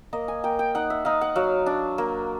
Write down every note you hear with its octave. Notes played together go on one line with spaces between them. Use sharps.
A#3 D#5
G#5
A#3 G5
G5
D#4 F#5
E5
D#4 F5
F#5
F#3 F5
D4
A#3